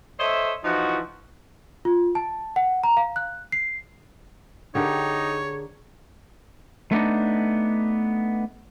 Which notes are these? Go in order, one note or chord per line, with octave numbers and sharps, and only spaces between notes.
A4 C5 C#5 D#5 E5
E3 F3 D#4 E4 F#4
F4
A5
F#5
A#5
F5
F#6
C7
D3 D#4 G4 G#4 A#4 C#5
A3 B3 D4 D#4